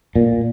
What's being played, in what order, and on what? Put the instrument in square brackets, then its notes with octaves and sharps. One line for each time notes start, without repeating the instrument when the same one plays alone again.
[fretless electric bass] A#2